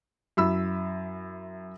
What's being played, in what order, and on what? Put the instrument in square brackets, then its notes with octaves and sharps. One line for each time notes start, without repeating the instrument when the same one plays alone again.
[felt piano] F#2 E4 B5 E6